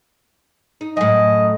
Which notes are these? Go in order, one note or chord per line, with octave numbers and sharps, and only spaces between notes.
D#4
F#2 A2 D#5